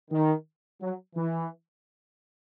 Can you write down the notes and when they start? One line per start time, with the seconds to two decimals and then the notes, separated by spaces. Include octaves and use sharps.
0.11 D#3
0.81 F#3
1.16 E3